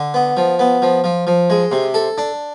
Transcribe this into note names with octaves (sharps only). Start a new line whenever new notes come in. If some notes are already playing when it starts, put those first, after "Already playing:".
Already playing: D3
B3
F3
B3
F3
F3
F3
G#3
C3
A4
D4